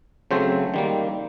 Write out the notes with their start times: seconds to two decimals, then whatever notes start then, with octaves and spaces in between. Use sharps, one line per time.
0.31 C#3 F#3 A3 C4 C5
0.74 D#3 G3 A#3